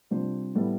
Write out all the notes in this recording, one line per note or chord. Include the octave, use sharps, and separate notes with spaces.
C3 G3 D4 F4 C5
A2 G3 B3 E4 A4